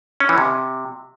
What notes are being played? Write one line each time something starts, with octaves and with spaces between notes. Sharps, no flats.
C#4
E3
C3